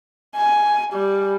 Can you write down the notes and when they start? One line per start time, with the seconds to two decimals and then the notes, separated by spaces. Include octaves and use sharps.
0.36 G#5
0.93 G3